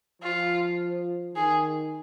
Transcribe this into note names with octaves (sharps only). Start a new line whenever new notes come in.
F3 F4
D#3 G#4